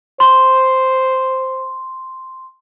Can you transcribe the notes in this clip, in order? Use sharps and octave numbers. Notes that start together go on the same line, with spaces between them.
C5 C6